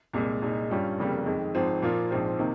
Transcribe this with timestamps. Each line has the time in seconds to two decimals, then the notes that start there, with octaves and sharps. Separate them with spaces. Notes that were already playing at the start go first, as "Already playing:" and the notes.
0.13 C2 A#2 G#3
0.42 C2 A#2 G#3 D#4
0.70 G2 G3 C#4 F4
0.99 F1 F2 C#3 G3 A#3
1.26 F2 D#3 G#3
1.55 G#1 G#2 F3 C4
1.82 A#2 F3 A#3 F4
2.11 A#1 G#2 F3 C4
2.39 C3 D#3 A#3